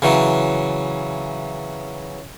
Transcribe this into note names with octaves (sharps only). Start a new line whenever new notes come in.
C#3 E3 F#3